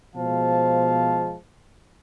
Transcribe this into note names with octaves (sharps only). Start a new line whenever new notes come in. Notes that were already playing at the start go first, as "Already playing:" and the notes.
B2 F3 G#3 C5 F5 A5